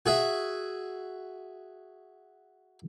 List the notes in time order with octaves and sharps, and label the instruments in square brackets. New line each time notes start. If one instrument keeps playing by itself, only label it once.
[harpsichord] F#4 G#4 E5